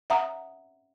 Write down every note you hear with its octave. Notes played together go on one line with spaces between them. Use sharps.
E5 F#5 A#5 D#6